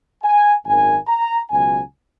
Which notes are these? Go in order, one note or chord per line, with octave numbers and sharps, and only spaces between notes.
G#5
G#1 F#2 D#3 G#5
A#5
C#2 B2 F#3 G#5